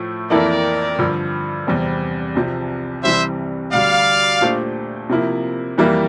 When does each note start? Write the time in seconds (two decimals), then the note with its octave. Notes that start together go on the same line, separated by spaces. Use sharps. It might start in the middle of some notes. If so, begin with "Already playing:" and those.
Already playing: A2 F3 A3
0.30 F2 E3 A#3 E4 A4 A#4 D5
0.99 G2 D3 F3
1.67 E2 C3 G3 C4
2.35 C2 C3 F3
3.03 C2 C3 E3 G3 C4 C5 E5
3.72 D2 D3 G3 D5 F5
4.41 A#2 A3 D4 G4 C5
5.10 C3 F3 A#3 E4
5.78 F2 E3 G3 A#3 E4